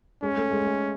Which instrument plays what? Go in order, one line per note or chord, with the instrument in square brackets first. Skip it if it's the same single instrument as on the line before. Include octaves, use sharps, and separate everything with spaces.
[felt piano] G#3 [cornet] C#4
[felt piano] A3
G#3
A3